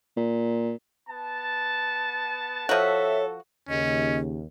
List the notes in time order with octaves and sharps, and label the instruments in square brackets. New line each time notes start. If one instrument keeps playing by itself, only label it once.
[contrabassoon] A#2
[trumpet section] B3 A5
[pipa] F3 F#4 [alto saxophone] A4 [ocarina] C#5 [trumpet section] E5
[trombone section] D#2 [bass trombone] C#3 [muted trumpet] C#4 [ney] D#5